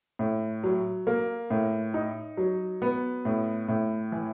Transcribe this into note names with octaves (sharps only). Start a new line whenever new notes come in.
A2
F#3
A#3
A2
D#4
F#3
B3
A2
A2
E3